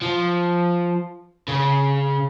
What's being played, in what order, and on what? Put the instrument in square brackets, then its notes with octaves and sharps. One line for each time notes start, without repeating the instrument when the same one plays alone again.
[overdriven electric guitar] F3
C#3